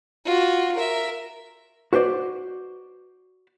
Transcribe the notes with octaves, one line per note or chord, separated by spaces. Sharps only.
F4 F#4
A#4 E5
F#4 B4 C5 D5